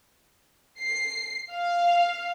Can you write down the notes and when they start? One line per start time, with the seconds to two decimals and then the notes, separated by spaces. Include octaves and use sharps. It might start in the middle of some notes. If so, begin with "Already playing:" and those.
0.79 C7
1.52 F5